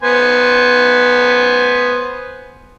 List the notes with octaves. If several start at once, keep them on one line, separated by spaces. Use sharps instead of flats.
B3 C5 G#5